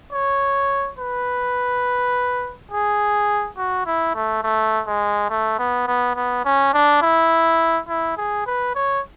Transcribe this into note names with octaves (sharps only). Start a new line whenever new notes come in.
C#5
B4
G#4
F#4
E4
A3
A3
G#3
A3
B3
B3
B3
C#4
D4
E4
E4
G#4
B4
C#5